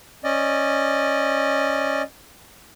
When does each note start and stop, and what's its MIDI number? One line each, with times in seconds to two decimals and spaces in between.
0.24 2.02 61
0.24 2.02 74
0.24 2.02 75